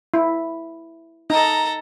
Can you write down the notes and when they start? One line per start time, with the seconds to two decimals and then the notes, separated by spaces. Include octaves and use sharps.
0.14 E4
1.30 D#4 A4 A#5